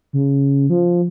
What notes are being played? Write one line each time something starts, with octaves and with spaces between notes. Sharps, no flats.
C#3
F3